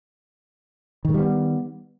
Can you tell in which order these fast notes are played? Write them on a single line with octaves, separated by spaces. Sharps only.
D#3 G#3 G3 B3